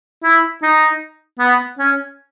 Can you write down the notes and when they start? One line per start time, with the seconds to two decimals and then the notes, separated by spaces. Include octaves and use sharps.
0.24 E4
0.63 D#4
1.39 B3
1.78 C#4